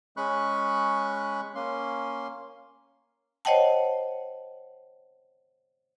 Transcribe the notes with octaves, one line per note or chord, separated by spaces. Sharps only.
G#3 C#4 B5 C#6 F#6
A#3 C#4 C6
C5 C#5 D#5 F#5 G5 A5